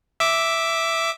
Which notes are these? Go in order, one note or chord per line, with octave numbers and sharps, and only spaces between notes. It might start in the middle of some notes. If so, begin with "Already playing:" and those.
E5 D6